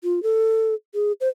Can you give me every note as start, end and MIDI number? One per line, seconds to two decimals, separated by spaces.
0.04 0.22 65
0.23 0.74 69
0.94 1.12 68
1.21 1.28 72